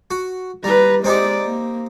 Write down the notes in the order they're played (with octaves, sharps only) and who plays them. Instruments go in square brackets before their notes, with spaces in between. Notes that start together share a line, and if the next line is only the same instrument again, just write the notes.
[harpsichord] F#4
[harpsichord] G3 [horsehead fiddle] B4 A#5
[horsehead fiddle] G#3 D5 [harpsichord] C4 D#4 G4
[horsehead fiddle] A#3